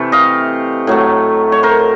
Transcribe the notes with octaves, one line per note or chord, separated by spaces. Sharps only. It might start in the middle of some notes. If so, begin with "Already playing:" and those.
Already playing: C3 E3 A3
D#5 F5
A2 F#3 A3
C#5
A#4 C5